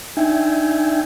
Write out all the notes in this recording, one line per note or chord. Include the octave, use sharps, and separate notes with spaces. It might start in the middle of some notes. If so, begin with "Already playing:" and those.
D4 D#4 E5 G5 G#5